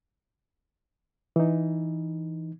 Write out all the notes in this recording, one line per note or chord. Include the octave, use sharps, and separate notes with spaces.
E3 D#4